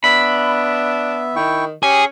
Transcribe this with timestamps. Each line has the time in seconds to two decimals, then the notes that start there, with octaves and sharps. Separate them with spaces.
0.04 B3 D4 E5 B5
1.36 D#3 E4 G5 C#6
1.83 C#4 G4 G#4